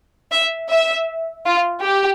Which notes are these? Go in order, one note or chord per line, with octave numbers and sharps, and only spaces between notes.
E5
E5
F4
G4